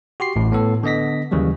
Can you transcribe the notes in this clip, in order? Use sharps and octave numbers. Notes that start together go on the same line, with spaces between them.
F#4 G4 C6 C7
A1 A2
A2 B3 A4
D3 B3 D#5 A#6 B6
D#2 C#3 E3 F#3 G3